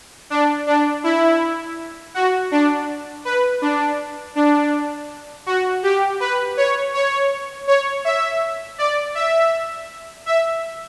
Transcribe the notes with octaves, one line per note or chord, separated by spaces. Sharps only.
D4
D4
E4
F#4
D4
B4
D4
D4
F#4
G4
B4
C#5
C#5
C#5
E5
D5
E5
E5